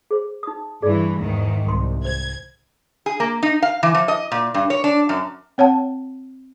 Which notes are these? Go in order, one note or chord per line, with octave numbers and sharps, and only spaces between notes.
G#4 C5
D#4 D#6
G2 E3 G#4 D5
E2 G#2 D#3
C2 C6
C5 G#6
G#4
A#3
D#4
F5
E3
F3
D#5
A#2
G2
C#5
D4
F#2
C4 C#5 F#5 A5